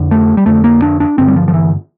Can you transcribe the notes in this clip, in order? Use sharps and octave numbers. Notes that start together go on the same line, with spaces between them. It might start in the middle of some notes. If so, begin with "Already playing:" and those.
Already playing: F2 D3
A3
G3
F2 D3 A3
A#3
D4
D4
G2 D3 C4
G3
F3
F3
E3